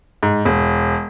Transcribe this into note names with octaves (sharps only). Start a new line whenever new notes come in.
G#2
E1